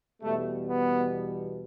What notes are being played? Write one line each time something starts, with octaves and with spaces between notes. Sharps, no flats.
E2 B2 G3 A3
B3